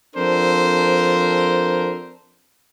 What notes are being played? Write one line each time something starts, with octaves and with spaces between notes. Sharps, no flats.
F3 C4 D4 A4 A#4 C5